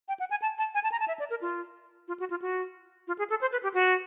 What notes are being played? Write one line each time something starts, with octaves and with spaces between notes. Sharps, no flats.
G5
F#5
G#5
A5
A5
G#5
A5
A#5
A5
E5
D5
A#4
F4
F4
F#4
F4
F#4
F4
G#4
A4
C5
B4
G4
F#4